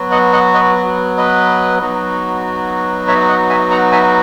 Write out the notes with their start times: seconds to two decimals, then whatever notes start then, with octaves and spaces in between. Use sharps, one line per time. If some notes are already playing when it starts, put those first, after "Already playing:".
Already playing: F#3 B3 F#4
0.11 D#5 F#5
0.33 D#5 F#5
0.54 B4 D#5
0.75 F#4
1.18 B4 D#5
1.81 F#3 B3 D#4 F#4
3.08 C#5 E5
3.29 D#5 F#5
3.49 E5 G#5
3.71 F#5 A#5
3.92 E5 G#5